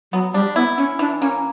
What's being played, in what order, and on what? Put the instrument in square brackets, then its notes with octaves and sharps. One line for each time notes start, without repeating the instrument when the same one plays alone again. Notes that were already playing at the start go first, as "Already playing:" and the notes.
[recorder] F#3 [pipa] B3
[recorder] G3 [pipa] D4
[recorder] B3 [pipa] E4
[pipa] E3 [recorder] C#4
[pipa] E3 [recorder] D4
[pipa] A#3 [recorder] C#4